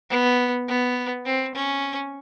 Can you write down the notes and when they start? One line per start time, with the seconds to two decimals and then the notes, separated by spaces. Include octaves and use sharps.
0.10 B3
0.68 B3
1.25 C4
1.55 C#4